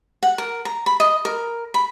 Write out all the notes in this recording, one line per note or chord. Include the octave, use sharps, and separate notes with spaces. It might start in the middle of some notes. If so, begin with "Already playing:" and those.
F#5
A#4
A#5
B5
D#5
A#4
B5